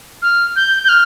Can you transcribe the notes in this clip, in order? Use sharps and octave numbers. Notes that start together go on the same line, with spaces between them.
F6
G6
G6
F6